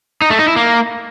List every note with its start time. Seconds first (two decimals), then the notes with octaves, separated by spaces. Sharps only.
0.22 D#4
0.30 A3
0.39 D#4
0.48 E4
0.56 A#3